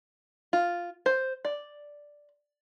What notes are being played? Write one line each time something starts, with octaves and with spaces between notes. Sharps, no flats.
F4
C5
D5